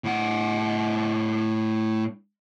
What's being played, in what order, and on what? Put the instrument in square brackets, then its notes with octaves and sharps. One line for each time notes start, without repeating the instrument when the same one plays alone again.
[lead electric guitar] A2 F#5